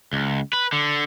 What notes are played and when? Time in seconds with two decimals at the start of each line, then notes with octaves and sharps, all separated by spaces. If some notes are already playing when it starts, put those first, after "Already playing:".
0.13 C#2
0.53 B4
0.73 D3